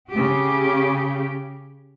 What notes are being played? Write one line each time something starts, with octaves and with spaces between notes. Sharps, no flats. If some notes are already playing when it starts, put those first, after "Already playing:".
C#3 G4